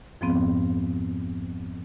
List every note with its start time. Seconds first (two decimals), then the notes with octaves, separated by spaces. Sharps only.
0.21 F2 G#2 F3 G#3 B3 C4